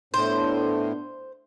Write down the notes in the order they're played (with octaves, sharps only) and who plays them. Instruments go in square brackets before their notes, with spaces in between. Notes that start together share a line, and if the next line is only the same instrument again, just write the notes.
[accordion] A2 [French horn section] B3 D4 [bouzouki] C5